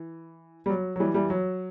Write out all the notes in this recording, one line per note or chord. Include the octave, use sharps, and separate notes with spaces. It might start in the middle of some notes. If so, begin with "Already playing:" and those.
Already playing: E3
G3
F#3
F#3
E3 G3
E3 G3
F#3